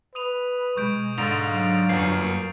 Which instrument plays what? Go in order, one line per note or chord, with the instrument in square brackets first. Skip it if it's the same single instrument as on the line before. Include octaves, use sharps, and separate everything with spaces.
[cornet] B4 [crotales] D#6 D#7 F7
[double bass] B2 G#3 [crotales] C#6 G6 D7
[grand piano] G#2 D3 [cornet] F5 [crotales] A6 D7 F7
[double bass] F#3 D4
[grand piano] G1 F#2 [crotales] C7
[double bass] A#3